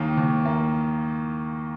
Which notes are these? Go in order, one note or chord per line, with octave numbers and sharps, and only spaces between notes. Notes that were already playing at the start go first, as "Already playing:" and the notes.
Already playing: D#2 D#3 A#3
D#2
A#3